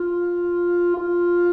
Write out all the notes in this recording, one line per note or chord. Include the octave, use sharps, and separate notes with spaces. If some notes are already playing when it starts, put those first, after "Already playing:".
Already playing: F4
F4